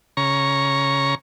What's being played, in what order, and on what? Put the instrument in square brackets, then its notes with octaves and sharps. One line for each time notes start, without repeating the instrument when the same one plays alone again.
[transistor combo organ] C#3 A#5 C#6